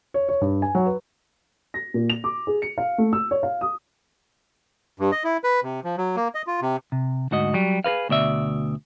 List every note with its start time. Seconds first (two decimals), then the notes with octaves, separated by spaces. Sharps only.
0.14 C#5
0.29 C#5
0.41 G2
0.62 G#5
0.75 F#3
0.86 B4
1.74 A#6
1.94 A#2
2.10 F7
2.24 D6
2.47 G#4
2.62 C#7
2.78 F5
2.98 A3
3.13 E6
3.31 C#5
3.43 F5
3.61 D#6
5.00 G2
5.12 D#5
5.24 E4
5.44 B4
5.63 C3
5.84 F3
5.98 F#3
6.16 A#3
6.35 D#5
6.47 F4
6.62 C3
6.92 C3
7.31 D2 G#2 F#4 D#5
7.54 F#3 G3
7.84 G#4 A#4 B4 F5
8.09 D2 B2 D5 E5